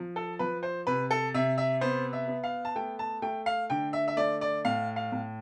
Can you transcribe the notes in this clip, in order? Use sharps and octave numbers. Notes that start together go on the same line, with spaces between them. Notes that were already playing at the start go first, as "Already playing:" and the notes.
Already playing: F3
A4
F3 B4
C5
C3 B4
A4
C3 E5
E5
B3 C5
E5
B3
F5
A5
A3 G5
A5
A3 G5
F5
D3 G5
E5
E5
A3 D5
D5
A2 F5
F5
A2